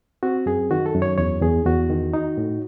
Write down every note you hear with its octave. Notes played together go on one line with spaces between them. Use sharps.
C4 F#4
F#2 G#4
D#3 F#4
A4
F#2
C#5
E2 C#5
E2 G#4
E2 F#4
D#3
D#4
A2